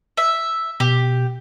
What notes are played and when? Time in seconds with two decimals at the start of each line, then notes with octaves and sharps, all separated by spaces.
0.17 E5
0.80 B2 G4